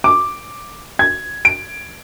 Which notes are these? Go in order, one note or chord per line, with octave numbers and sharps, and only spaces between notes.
D6
G#6
D7